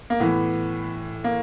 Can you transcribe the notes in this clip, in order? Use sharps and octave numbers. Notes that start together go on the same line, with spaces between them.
A#3
A2 E3 B3
A#3